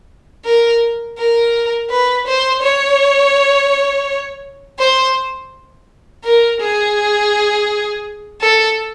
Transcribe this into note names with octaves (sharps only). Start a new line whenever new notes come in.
A#4
A#4
B4
C5
C#5
C5
A#4
G#4
A4